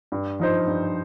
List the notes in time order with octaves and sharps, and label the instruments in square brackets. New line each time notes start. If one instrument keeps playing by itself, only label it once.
[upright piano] G2
F3 D#4 C5
G2